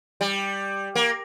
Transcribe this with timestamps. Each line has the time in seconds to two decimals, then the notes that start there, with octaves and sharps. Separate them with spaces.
0.21 G3
0.95 A#3